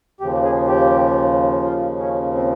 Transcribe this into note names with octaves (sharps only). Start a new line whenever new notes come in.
D#2 C#3 F3 G4
G#4
G4
F4
C#4
C4